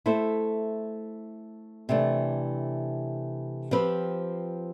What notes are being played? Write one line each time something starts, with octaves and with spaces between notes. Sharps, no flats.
A3 E4 A4 C5
C3 E3 A3 D4
F3 C4 G4 B4